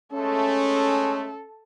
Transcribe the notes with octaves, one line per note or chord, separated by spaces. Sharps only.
G#3 A3 C#4 A4